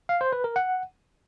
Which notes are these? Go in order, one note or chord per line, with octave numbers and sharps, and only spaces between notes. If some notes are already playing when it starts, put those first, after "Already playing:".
F5
C5
B4
A#4
F#5